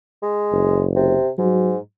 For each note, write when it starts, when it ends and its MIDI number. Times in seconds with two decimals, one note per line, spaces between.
0.22 0.85 56
0.52 1.16 30
0.96 1.29 48
1.38 1.78 44
1.38 1.73 54